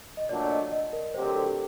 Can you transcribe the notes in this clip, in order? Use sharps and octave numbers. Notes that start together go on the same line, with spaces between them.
D#5
A#2 F#3 A3 D4 D5
D#5
D#5
A#4
D2 D3 F#3 C4 G4 C5
A#4
A4
G4